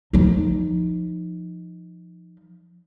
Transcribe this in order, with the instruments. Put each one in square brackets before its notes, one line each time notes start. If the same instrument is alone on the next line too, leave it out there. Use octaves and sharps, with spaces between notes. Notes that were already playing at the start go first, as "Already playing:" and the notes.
[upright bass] F3 D#4